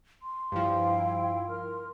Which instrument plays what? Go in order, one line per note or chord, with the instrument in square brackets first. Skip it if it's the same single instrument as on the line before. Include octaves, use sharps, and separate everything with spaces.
[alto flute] C6
[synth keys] G2 F3 [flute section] E4 F5 G5
[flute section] A#4 F6